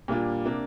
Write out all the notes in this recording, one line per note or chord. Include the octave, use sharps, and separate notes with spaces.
A#2 G3 A#3 D4 F4
C3 A#3 D4